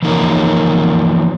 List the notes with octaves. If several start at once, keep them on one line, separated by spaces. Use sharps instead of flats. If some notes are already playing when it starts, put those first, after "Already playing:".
E3 F3 A#3 D#4 A#4 C#5